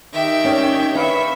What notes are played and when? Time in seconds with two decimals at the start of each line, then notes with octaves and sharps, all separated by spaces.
0.14 D#3 G4 E5 G5
0.45 C#4 D5
0.95 D4 B4 E5 F5 B5 C#6